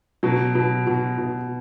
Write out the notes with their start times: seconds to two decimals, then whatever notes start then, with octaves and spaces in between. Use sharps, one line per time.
0.23 B2 F#3
0.55 B2
0.87 B2
1.18 B2